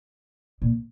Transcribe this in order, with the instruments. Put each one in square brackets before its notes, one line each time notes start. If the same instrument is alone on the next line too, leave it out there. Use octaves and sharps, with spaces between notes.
[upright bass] A#2